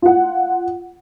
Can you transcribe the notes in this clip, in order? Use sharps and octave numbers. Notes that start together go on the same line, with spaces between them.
F4 F#5